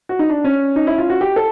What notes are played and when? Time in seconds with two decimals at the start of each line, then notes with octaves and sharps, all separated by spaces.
0.09 F#4
0.19 D#4
0.29 D4
0.45 C#4
0.76 D#4
0.87 E4
0.98 F4
1.10 F#4
1.21 G4
1.36 A4